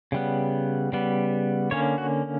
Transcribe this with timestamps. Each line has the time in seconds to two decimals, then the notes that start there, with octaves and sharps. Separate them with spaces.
0.12 C#3 G3 B3
0.92 C#3 G3 B3
1.71 D3 A#3 C#4 C#5
1.98 F#4